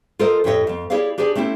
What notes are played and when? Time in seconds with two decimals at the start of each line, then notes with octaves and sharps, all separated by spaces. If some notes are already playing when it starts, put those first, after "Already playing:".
0.19 F4 A4 A#4 C5 D#5
0.44 F2 A2 E4 G4 C#5 D#5
0.67 F2 C4
0.90 E4 G4 G#4 C#5 D5 F5
1.18 D4 G4 G#4 C5 D5
1.36 A3 C4 C#4 E4 G4